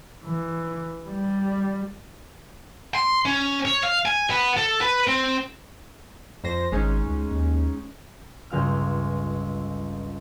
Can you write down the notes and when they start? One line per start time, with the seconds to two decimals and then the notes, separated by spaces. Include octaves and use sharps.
0.24 E3
1.07 G3
2.95 C6
3.25 C#4
3.65 C#5
3.83 F5
4.06 G#5
4.30 B3
4.57 A4
4.81 B4
5.07 C4
6.44 F2 C5 A#6
6.72 G#1 G#3 C#4 D#4
7.07 C#2
7.31 D#2
8.50 G1 C#2 F5 F6